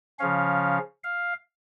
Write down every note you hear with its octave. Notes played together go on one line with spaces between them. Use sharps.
C#3 F3 C#4 F5
F5